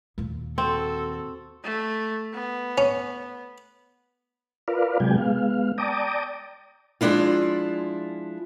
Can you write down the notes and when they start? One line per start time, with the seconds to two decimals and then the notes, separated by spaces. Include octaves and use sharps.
0.18 D#2 A#2
0.58 C4 F#4 A4
1.64 A3
2.33 B3
2.78 C#4
4.68 F4 A#4 B4 D5 F5
5.00 C3 F#3 G#3 G5 G#5
5.18 G#3 B3 F5
5.78 D5 G5 A5 A#5 D6 D#6
7.01 F3 G#3 D4 E4 F4